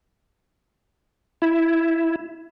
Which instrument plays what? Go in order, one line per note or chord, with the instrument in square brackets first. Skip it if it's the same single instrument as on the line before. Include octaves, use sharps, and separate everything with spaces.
[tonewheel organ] E4